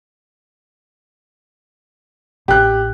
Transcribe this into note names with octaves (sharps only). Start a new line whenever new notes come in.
A1 G4 F#6